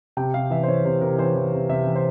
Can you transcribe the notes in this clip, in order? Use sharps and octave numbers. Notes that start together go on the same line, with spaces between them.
C3 G5
C3 F5
E3 E5
C5
E3 C#5
C3 C5
C3 A#4
E3 C5
E3
C3
C3 E5
E3
C5